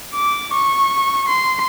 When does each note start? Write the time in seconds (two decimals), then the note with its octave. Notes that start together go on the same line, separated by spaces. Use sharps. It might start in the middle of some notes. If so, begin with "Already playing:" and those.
0.15 D6
0.53 C#6
1.28 C6